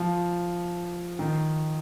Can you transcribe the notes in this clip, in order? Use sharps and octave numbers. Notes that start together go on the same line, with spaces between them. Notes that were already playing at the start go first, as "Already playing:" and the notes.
Already playing: F3
D#3